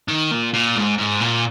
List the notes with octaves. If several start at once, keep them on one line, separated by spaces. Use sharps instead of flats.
D#3
A#2
A#2
G#2
G#2
A#2